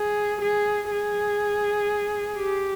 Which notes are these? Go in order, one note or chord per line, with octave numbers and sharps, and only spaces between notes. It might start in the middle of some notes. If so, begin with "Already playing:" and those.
Already playing: G#4
G#4
G#4
G4